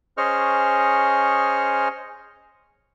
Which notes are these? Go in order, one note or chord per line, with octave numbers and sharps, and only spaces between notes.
C#4 G#4 C5 D#5 C#6 F6